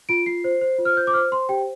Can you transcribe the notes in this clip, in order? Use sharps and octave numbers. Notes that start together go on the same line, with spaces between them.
F4 D7
F4 C7
C5
C5
F4
F6
C5 G6
D6
C5 F6
C5 C6
G4 G5